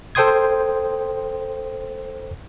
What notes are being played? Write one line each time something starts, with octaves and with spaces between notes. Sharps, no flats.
A4 C5 G5 C6 D#6 G#6